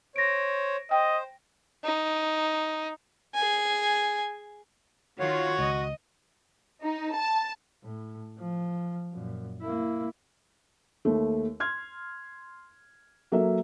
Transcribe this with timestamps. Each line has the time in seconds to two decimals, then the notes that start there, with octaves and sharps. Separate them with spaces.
0.16 C5 C#5 A#6 D7
0.91 C5 D#5 G5
1.84 D#4
3.34 G#4 G#5
5.20 D#3 F4 F#4 C#5
5.59 C#2 D#5
6.83 D#4
7.14 A5
7.84 A2
8.38 F3
9.13 F#2 A#2
9.61 A#3 E4
11.05 D#2 A3
11.60 C6 F6 G#6
13.32 F#3 A#3 A4 A#4 E5